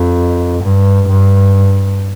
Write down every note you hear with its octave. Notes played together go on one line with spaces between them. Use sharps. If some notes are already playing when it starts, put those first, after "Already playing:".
Already playing: F2
G2
G2